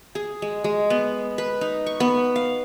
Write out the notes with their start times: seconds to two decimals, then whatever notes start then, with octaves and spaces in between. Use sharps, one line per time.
0.15 G#4
0.42 G#3
0.64 G#3
0.90 B3
1.38 B4
1.61 D#4
1.86 C#6
2.00 B3
2.36 F5